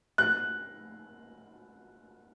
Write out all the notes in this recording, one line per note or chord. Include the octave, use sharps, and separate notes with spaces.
F#6